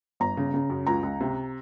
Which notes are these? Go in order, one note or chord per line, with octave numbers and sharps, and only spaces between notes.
G1 A#5
C#3
C#3
F#2
C#2 A#5
C#2
C3